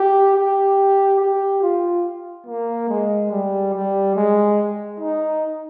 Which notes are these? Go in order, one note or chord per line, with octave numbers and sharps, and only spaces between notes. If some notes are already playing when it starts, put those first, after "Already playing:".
Already playing: G4
G4
G4
F4
A#3
G#3
G3
G3
G#3
D#4